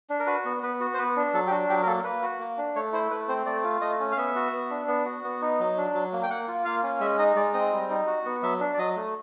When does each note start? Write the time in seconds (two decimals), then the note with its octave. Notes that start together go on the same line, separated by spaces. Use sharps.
0.10 D4
0.20 A#4
0.27 F#4 B4
0.45 B3
0.63 B3 B4
0.80 F#4
0.94 C5
0.98 B3 B4
1.17 D4
1.34 F#3 A4
1.47 G4
1.51 D4 F#4
1.69 F#3 G4
1.83 A#4
1.86 A#3 A4
2.04 A#3 B4
2.22 F#4
2.39 A#3
2.58 D4
2.76 A3 C#5
2.93 E4 C5
3.11 A3 B4
3.28 C4 C5
3.46 A3 D5
3.64 F4
3.81 A3 D#5
4.00 C#4
4.12 F5
4.17 B3 E5
4.36 F#4
4.52 B3
4.70 D4
4.88 B3
5.05 F#4
5.24 B3
5.42 D#4
5.60 F#3
5.77 D4
5.94 F#3
6.13 A#3
6.23 G5
6.30 A#3 F#5
6.48 F4
6.65 A#3 F5
6.83 C#4
7.00 G#3 E5
7.18 D#4 D#5
7.36 G#3 D5
7.54 C4 D#5
7.72 G3
7.90 D#4
8.07 F#4
8.26 B3
8.43 F#3 E5
8.60 D4
8.74 D5
8.78 F#3 D#5
8.96 A3